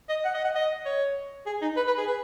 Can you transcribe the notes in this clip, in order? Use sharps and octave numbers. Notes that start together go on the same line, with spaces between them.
D#5
F#5
D#5
F#5
D#5
C#5
G#4
D#4
B4
B4
G#4
B4